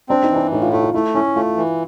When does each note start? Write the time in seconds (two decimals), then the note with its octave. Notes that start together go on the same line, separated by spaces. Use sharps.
0.09 C4 D4
0.23 D#4
0.31 E3
0.36 D4
0.51 A2 D#4
0.62 F4
0.72 A3 F4
0.83 F4
0.94 A3 E4
1.15 C#4 E4
1.36 A3 F4
1.57 E3